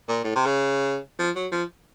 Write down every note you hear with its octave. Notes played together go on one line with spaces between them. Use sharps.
A#2
A2
C3
C#3
F3
F#3
F3